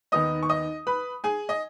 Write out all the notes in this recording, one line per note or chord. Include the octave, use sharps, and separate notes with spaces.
D#2 D#3 B3 D#4 D#5 D#6
C#6
D#5 D#6
B4 B5
G#4 G#5
D#5